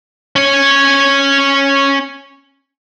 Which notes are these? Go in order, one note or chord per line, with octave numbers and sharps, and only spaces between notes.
C#4 C#5